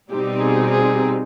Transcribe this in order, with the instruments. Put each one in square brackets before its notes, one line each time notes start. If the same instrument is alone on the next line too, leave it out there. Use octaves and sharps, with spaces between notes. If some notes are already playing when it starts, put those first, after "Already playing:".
[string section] B2 G3 C4 D#4 [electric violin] G4
[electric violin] G#4
G#4